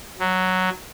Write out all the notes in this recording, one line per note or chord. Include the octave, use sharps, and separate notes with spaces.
F#3